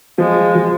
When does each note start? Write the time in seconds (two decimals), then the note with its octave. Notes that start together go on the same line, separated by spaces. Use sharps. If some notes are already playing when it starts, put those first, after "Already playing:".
0.18 F3 G#3
0.55 F3